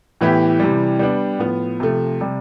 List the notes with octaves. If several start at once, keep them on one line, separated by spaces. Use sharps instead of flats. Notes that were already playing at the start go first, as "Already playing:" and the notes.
A2 E3 B3 E4 G4
C3 E3 G3
G3 B3 D4
A2 F3 B3
C3 F3 A3
C3 G3